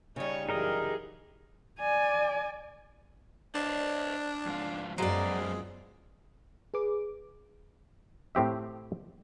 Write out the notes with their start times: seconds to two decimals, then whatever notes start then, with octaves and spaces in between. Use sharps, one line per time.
0.16 C#3 G3 D#4 C#5
0.49 F#2 E3 D#4 G4 G#4 A#4 D#5
1.80 D5 G#5
3.55 D4 C5 D5 D#5
4.46 F2 G#2 F4
4.98 F#2 F#3 G#3 B3 F4 C5 D5
6.74 G#4 B4 D6
8.35 A2 C4 G4 E5